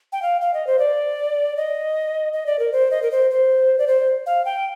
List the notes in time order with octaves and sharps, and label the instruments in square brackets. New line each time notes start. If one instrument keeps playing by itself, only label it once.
[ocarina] G5
F5
F5
D#5
C5
D5
D#5
D#5
D5
A#4
C5
D#5
A#4
C5
C5
D5
C5
F5
G5